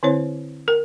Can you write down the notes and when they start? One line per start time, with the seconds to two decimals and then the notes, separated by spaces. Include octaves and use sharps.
0.03 D3 C4 E4 C5 C#5
0.68 A#4